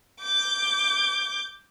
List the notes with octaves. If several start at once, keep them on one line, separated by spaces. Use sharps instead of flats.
D6 G6